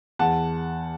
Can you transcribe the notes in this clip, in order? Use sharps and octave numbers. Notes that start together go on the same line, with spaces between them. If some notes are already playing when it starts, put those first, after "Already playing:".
E2 F#5 A5